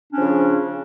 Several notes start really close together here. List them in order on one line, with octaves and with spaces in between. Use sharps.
D4 C#4 F3 C#3